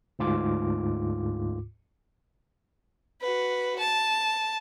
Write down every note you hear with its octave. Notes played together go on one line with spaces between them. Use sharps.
D2 G#2 F4 D6
F#4 B4
A5